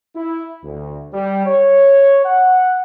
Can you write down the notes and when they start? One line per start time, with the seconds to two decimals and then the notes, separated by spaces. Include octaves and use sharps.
0.15 E4
0.63 D2
1.12 G3
1.46 C#5
2.25 F#5